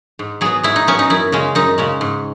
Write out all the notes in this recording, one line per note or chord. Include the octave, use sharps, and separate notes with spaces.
G#2
F#3 B3 G#4
G#2 E4
D#4
F#3 B3 C#4
D#4
F#2 E4
C#3 G#3 C#4
F#2 D#4
C#3 G#3 C#4
G#2